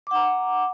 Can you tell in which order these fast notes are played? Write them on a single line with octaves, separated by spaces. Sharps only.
D6 F#5 A#5